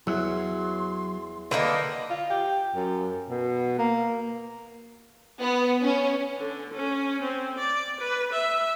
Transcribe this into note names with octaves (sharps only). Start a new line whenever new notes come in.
E2 F#3 C6
D3 D#3 A#3 B4 D#5
F4
G4
F#2
B2
A#3
B3
C#4
D3
C#4
C4
D5
B4
E5